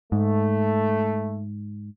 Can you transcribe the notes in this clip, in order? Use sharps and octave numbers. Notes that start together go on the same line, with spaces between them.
G#2 A3